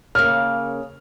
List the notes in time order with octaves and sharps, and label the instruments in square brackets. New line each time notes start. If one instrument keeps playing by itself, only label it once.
[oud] C#3 A#3 [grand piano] F6